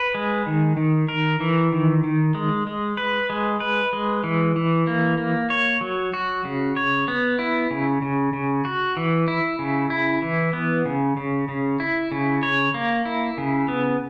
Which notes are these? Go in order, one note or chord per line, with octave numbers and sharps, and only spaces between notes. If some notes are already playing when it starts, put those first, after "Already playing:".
Already playing: B4
G#3
D#3
D#3
A#4
E3
D#3
D#3
G#3
G#3
B4
G#3
B4
G#3
E3
E3
A#3
A#3
C#5
F#3
F#4
C#3
C#5
B3
E4
C#3
C#3
C#3
F#4
E3
E4
C#3
E4
E3
B3
C#3
C#3
C#3
E4
C#3
C#5
A#3
E4
C#3
B3